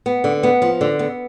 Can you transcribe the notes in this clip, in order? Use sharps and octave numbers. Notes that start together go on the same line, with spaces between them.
B3
D3
B3
F3
D3
B3